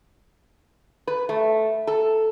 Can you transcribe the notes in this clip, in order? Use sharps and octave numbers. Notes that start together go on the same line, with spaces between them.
B4
A3
A4